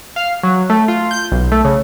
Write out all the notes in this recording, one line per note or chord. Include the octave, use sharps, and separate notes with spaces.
F5
F#3
A3
F4
G6
B1
A3
C#3